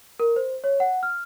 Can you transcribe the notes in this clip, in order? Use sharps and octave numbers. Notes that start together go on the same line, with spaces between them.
A#4
C5
C#5
F#5
F6